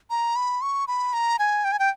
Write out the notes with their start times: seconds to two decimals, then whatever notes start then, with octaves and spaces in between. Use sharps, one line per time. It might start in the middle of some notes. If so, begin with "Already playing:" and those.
0.10 A#5
0.36 B5
0.62 C#6
0.88 B5
1.13 A#5
1.39 G#5
1.64 G5
1.72 G#5
1.79 G5